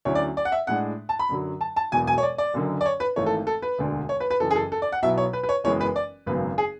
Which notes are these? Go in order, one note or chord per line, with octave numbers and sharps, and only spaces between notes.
D2 D3 F#3 C#4 E4 C#5
D5
D5
F#5
E5
A2 G#3 D4 F#5
A5
B5
F#2 D3 F#3
A5
A5
E1 E2 B2 F#3 G#5
G#5
C#5
D5
D5
F#1 F#2 D3 F#3
D5
C#5
B4
G#1 G#2 E3 A3 C#5
A4
A4
B4
E1 D2 D3
C#5
B4
B4
F#1 F#2 E3 A4
G#4
A4
A4
D5
F#5
B1 B2 F#3 B3 E4 E5
C#5
B4
B4
C#5
F#1 F#2 E3 G#3 B3 C#5
B4
D5
G#1 F#2 C#3 F#3 B3 B4
G#4